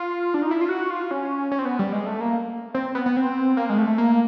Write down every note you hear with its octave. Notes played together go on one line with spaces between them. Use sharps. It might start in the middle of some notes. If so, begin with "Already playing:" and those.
Already playing: F4
D4
D#4
E4
F4
F#4
F4
C#4
C#4
C4
B3
G3
G#3
A3
A#3
C4
B3
B3
C4
A#3
G#3
A3
A#3